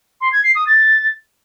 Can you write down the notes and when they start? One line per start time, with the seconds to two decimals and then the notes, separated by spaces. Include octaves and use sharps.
0.21 C6
0.32 G#6
0.44 C7
0.55 D#6
0.67 A6